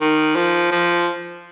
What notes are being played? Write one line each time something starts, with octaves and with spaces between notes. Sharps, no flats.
D#3
F3
F3